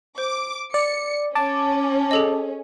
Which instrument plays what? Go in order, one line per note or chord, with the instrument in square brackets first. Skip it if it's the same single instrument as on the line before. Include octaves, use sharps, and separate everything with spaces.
[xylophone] C5 [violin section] D6
[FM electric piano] D5 [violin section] C#7
[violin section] C#4 [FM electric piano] A5 D6
[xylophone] G#4 A4 D#5